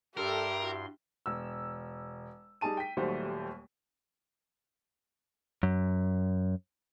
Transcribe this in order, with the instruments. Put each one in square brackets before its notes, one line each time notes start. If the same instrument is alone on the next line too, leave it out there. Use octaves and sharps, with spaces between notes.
[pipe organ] G2 C6 [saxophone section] G3 A4 [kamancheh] G4 E5 [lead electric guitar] A#4
[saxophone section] E4 F#4
[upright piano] E1 E6
G3 D#4 G#4 A5 D#7
G5 B6
D#1 D#2 F#3 G3 A3 C5
[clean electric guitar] F#2